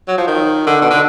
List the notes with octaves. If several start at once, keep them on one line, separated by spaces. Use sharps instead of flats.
F#3
F3
D#3
D3
B2
D3